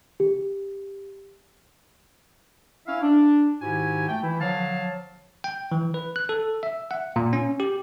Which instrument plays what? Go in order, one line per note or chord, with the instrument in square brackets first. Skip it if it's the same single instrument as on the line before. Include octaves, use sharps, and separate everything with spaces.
[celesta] G4
[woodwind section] C#4 E4 E5 F5
D4
G#2 D#3 E4 F#4 G4 G#5
A3 G5
E3 E4
D3 F3 F#3 C#5 F5 A5
[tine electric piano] G5
E3
B4
F#6
A4
E5
F#5
A#2
C#4
G4